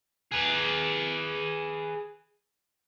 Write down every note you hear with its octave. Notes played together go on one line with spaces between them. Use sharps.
G#4 B4